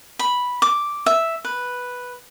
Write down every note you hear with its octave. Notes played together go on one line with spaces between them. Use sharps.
B5
D6
E5
B4